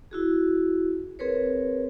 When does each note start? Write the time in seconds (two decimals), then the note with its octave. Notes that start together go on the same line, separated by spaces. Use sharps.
0.11 E4 F#4 G#4
1.19 C4 G#4 A#4 B4 C#5